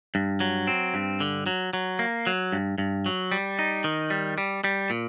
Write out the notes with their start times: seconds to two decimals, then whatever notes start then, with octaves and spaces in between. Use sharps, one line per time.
0.15 G2
0.40 F#3
0.67 C4
0.94 G2
1.20 D3
1.46 F#3
1.73 F#3
1.99 A#3
2.27 F#3
2.53 G2
2.78 G2
3.06 F#3
3.32 G3
3.59 D#4
3.84 D#3
4.10 G3
4.38 G3
4.64 G3
4.90 A#2